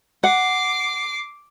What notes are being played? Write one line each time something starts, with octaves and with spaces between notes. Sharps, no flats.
F#5 D6 C7